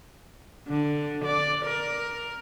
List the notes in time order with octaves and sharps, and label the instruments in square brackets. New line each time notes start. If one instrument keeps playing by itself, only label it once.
[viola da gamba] D3
D5
A#4